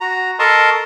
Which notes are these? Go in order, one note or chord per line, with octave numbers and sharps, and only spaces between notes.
F#4 A#5
A4 A#4 D#5 A5 C6 C#6